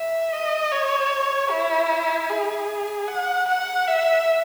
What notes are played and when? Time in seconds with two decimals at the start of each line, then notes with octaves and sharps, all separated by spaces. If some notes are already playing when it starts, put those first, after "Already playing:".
Already playing: E5
0.32 D#5
0.72 C#5
1.51 E4
2.29 G#4
3.08 F#5
3.48 F#5
3.87 E5